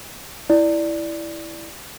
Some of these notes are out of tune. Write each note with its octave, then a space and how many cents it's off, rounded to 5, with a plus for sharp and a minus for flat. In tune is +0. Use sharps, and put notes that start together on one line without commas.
E4 +0 D5 +0